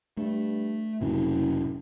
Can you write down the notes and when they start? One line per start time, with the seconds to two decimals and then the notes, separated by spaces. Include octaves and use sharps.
0.17 G2 A3
1.01 F#1 F2 A2 C3